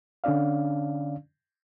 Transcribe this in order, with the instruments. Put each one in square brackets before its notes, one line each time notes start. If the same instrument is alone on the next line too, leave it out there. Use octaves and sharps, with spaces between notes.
[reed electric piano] D3 C#4 D4 D5 F5